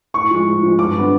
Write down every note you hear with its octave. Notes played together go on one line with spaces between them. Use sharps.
A2 C#6
F3 G#3
A2
F3 G#3
G2 D6
D3 G3 B3